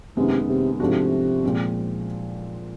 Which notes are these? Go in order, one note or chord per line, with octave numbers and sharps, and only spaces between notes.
F#2 C3 D#3 G#3 B3
C3
G#2 C3 F3 A3 D4 F#4
A#2 F3 G#3 C4